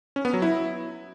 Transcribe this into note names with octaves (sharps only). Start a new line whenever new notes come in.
C#4
B3
F#3
E4